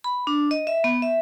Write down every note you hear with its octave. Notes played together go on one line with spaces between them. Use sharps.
B5
D4
D#5
E5
B3
E5